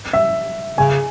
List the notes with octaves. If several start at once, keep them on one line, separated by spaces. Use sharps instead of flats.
E5
C#3 G#5